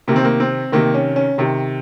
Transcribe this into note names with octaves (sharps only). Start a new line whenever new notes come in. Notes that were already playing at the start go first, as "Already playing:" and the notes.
C3 D#3 A#3 C4
A#3
C4
C3 D#3 A#3
C#4
C#4
C3 D#3